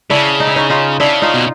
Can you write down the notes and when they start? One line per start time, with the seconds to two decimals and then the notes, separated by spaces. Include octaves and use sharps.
0.10 C#3 D4 E4
0.40 D#4
0.47 E4
0.56 C#4 D#4
0.70 D#4 F4
1.00 C#3 D4 E4
1.22 D#4 F4
1.34 B2